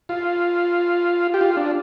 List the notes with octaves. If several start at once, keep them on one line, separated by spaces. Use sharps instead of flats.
F4
G4
F4
D4